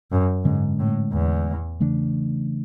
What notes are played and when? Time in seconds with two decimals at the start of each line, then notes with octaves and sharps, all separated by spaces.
0.12 F#2
0.44 G#2 D3 G#3 C#4
0.79 A2
1.12 E2
1.80 C#3 E3 A3 D4